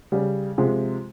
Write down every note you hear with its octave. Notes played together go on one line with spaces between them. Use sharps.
C#3 G3
C3 F3 G#3